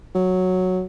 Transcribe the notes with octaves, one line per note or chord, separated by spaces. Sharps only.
F#3